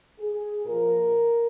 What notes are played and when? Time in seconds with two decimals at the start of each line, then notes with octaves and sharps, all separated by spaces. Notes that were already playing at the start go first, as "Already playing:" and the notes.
0.19 G#4
0.65 A#2 F3 A#4